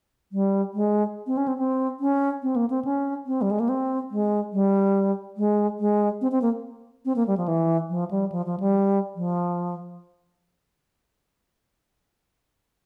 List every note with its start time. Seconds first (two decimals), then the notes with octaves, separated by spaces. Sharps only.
0.32 G3
0.74 G#3
1.27 C4
1.37 C#4
1.48 C4
1.58 C4
2.00 C#4
2.43 C4
2.56 A#3
2.70 C4
2.85 C#4
3.27 C4
3.42 G3
3.51 G#3
3.60 A#3
3.69 C4
4.11 G#3
4.53 G3
5.37 G#3
5.79 G#3
6.21 C4
6.32 C4
6.42 A#3
7.05 C4
7.16 A#3
7.27 G3
7.37 F3
7.48 E3
7.90 F3
8.11 G3
8.32 F3
8.46 F3
8.60 G3
9.16 F3